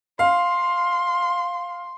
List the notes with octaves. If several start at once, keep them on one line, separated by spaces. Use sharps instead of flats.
F5 C6